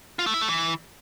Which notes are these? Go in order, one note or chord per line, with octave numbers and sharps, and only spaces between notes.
F4
A3
E4
A3
E3